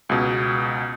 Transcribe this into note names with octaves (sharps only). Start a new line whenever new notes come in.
C#2 B2